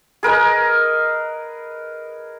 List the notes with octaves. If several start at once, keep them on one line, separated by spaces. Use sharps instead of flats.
G#4 A#4 B4 D#5